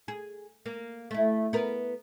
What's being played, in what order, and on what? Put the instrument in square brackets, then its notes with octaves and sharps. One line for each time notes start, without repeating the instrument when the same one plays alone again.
[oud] G#4
A#3
A3 E4
B3 A#4